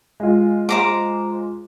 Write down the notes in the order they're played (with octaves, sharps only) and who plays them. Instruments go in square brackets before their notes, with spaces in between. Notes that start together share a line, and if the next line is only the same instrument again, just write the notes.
[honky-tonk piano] G#3 F4
[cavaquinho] C5 A#5 D6